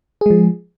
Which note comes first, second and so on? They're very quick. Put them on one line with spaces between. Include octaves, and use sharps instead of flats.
G#4 G#3 F3